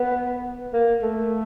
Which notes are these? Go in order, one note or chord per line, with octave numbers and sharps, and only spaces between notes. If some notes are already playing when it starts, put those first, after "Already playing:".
Already playing: B3
A#3
A3